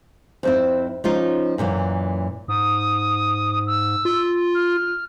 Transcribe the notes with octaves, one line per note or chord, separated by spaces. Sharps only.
F2 C4 E4
F3 C#4 D#4 F4
F#2 A#2 D3 E3
G#2 D#6
E6
F4
F6